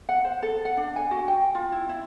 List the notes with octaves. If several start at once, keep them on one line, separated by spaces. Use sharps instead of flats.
F#5
C5
A4
F#5
D4
G#5
F#4
G5
F4
E4
E4